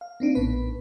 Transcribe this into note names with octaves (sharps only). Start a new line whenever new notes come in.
F5
A#3 C4 D4 D#4
A#1 A2 B3 B4